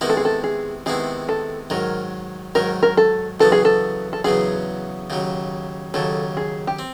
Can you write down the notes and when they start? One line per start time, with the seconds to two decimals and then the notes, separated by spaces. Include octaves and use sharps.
0.01 C3 D#3 G#3 B3 E4 A#4
0.10 A4
0.17 G#4
0.25 A4
0.44 G#4
0.86 C3 D#3 G#3 B3 E4 G#4
1.29 A4
1.70 G#2 D#3 F#3 A#4
2.55 G#2 D#3 F#3 A#4
2.83 A#4
2.97 A4
3.40 E2 C#3 F#3 B3 A4
3.52 G#4
3.65 A4
4.13 A4
4.24 E2 C#3 F#3 B3 G#4
5.10 D#2 C#3 F#3
5.94 D#2 C#3 F#3 A4
6.37 G#4
6.67 G4
6.79 C4